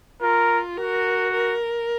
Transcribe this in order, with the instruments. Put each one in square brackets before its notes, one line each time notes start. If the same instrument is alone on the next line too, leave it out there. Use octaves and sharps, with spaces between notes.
[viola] F4 [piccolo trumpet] A#4
[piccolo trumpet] F#4 [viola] A#4
[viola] A#4